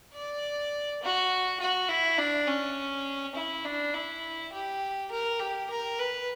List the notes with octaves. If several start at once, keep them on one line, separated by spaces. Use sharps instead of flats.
D5
F#4
F#4
E4
D4
C#4
E4
D4
E4
G4
A#4
G4
A#4
B4